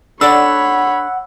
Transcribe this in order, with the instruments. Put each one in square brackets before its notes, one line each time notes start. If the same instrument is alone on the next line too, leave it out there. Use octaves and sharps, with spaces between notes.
[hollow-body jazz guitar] D4 A4 D5 [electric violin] C#5 B5 [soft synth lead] F#5 [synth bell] E6